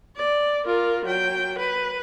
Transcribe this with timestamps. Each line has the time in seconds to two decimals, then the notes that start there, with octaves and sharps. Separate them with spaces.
0.17 D5
0.66 F4 A#4
1.05 F#3 G5
1.59 B4